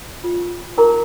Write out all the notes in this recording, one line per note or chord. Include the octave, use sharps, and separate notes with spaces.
F4
D#4 G#4 A#4 A#5